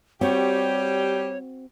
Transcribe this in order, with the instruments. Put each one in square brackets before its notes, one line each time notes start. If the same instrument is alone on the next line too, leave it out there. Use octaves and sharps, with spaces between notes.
[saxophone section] G3 G4 [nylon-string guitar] C4 F#4 [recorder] C#5